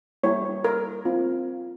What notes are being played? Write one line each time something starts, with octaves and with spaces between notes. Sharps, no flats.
G3 A#3 E4 G4 C#5
A#4
C4 F4